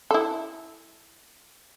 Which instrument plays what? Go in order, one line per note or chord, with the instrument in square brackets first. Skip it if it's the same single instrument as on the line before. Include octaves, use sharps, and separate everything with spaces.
[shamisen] E4 A4